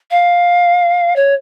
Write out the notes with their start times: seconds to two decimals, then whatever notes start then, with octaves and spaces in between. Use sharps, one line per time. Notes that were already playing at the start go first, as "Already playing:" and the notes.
0.11 F5
1.16 C#5